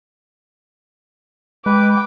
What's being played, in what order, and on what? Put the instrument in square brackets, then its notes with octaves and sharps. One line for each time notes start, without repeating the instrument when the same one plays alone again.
[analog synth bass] G#3 [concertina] B4 [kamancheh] G5 D6